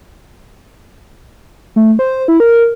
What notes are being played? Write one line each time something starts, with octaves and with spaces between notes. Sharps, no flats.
A3
C5
E4
A#4